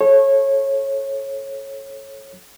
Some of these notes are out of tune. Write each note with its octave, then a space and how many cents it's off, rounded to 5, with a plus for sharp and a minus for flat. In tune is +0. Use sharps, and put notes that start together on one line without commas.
A4 -25 C#5 -25